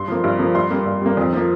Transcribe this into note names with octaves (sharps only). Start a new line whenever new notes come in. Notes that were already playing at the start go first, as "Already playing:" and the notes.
Already playing: G2 C6
F3 A#3
G2
F3 A#3
G2 C6
G3 A#3
G2
G3 A#3
F2
F3 A#3